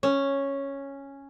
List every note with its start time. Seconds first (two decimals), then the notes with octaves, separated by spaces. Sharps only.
0.03 C#4